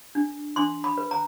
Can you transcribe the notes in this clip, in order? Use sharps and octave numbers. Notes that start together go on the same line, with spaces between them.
D4
D4 C6
B5
B4
A#5